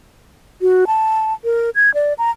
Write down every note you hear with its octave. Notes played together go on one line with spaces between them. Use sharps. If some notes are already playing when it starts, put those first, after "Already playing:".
F#4
A5
A#4
G#6
D5
A#5